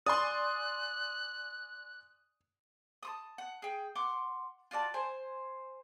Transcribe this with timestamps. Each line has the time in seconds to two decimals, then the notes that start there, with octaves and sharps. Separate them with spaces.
0.06 D5 G#5 C6 D#6 F#6
3.03 A5 C6 D#6
3.38 F#5
3.62 G#4 G5
3.95 F#5 C6 D6
4.71 F4 F#4 D5 A5
4.94 C5 G#5